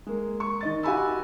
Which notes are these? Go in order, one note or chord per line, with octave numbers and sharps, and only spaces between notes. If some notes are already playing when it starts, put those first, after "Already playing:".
G#3 A#3
C#6
D#3 D#5 A6
F#4 G4 G#5 B5 E6